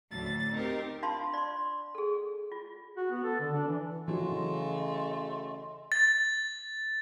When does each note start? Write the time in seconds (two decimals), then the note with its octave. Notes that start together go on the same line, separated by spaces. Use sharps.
0.11 D2 A2 A6
0.53 C4 D#4 G4 A#4 C5
1.02 D4 F4 F5 A5 B5 C6
1.34 D5 C6
1.95 G#4 A4
2.52 F4
2.97 F#4
3.11 B3
3.24 A4
3.40 D3
3.54 D4
3.68 E3
4.08 C#3 E3 F#3 A3 D#5 C6
5.92 A6